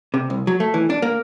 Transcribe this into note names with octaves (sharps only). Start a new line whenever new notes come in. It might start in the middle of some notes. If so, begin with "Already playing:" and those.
C3
C2
F#3
A3
E3
D4
A#3